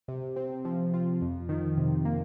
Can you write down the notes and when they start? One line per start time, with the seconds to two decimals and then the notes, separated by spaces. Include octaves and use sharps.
0.08 C3
0.36 C4
0.65 F3
0.94 F4
1.21 F2
1.49 D#3
1.77 C3
2.05 A#3